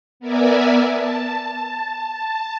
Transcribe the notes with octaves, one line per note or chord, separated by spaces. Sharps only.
B3 A#4 D5 E5 G#5
A5